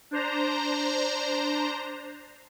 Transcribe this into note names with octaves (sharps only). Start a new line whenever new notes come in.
D4 C5 A#5